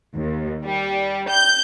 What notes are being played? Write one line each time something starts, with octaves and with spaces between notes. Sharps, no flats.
D#2
G3
G6